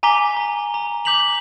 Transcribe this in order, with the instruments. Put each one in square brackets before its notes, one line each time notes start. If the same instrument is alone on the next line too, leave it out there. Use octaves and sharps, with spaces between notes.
[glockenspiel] G#5 A#5 D6 B6 G7
A#5
A#5
D6 G6 B6 F7 F#7